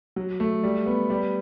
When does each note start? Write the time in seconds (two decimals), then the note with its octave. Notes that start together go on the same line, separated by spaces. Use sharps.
0.16 F#3
0.40 A3
0.64 G3
0.86 B3
1.10 G3